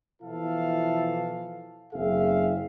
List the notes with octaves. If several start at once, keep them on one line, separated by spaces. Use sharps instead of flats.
B2 E3 F3 E4 A4 F5
F#1 F#2 C4 G#4 E5 F5